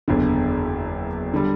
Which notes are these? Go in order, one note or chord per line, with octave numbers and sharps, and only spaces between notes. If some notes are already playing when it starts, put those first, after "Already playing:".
F#1 E2 D3
D3 G3